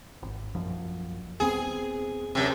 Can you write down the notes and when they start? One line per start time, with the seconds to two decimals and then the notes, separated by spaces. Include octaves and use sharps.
0.22 G#1
0.55 A#1 F#2 F3
1.40 D#1 B3 C4 G#4
2.35 F#2 C3